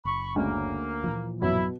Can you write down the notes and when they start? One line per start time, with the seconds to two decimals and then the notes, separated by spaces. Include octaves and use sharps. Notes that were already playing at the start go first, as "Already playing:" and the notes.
0.05 F#1 B5 C#6
0.36 D2 G#3 A#3 C#4
1.04 A#2 E3 F3
1.42 A1 F#2 B2 F#3 E4